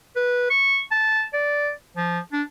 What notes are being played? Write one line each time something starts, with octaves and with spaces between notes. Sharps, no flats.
B4
C#6
A5
D5
F3
D4